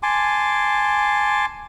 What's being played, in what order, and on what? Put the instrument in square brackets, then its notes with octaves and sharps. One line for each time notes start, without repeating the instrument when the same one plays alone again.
[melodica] G#5 A5 C6 D6